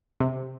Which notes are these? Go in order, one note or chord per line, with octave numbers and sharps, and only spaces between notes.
C3